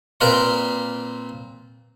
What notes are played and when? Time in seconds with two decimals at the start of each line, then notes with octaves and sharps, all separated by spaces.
0.21 A#2 C4 A#4 B4 F5 C6